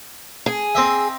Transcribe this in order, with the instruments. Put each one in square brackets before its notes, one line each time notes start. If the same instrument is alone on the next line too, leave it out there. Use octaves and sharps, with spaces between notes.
[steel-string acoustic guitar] G#4
[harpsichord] C4 D#5 E5